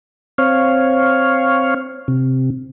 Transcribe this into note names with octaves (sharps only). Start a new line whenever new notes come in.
C4 C#5 F5
C3